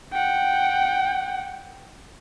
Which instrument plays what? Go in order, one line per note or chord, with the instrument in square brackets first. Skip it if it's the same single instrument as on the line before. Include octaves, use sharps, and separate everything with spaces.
[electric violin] F#5 G5